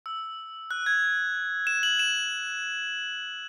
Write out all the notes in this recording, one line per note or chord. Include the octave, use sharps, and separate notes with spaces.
E6
F#6
G#6
E7
F#7
E7